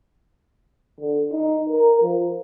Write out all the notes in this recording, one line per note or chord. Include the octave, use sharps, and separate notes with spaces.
D3
D#4
A#4
F3